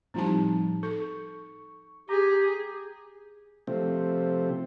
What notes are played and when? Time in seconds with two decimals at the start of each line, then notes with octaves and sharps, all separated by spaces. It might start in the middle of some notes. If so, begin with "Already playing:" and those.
0.14 A2 F3 G3 C4 D#4 A5
0.83 A4 C#6
2.09 G4 G#4 A#5
3.67 C3 F3 A3 C4